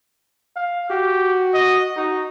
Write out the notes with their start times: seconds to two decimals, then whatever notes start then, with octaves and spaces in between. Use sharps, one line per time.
0.56 F5
0.90 F#4 G4
1.54 D#5
1.97 D#4 F#4